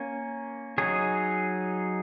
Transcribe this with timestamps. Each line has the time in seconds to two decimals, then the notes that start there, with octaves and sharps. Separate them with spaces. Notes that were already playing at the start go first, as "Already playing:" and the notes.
Already playing: A#3 C#4
0.78 F#3 D#4 G#4 C#5